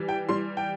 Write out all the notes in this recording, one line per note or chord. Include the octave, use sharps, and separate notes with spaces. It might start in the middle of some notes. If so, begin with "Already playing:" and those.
Already playing: E3 G3
G5
G3 C6
G5